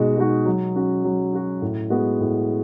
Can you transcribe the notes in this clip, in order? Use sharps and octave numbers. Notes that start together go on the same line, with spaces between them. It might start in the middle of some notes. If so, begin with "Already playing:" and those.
Already playing: B2 G#3 D#4 F#4
G#3 D#4 F#4
F#3
C#4 F#4
F#3
C#4 F#4
A2
G#3 B3 F#4
A2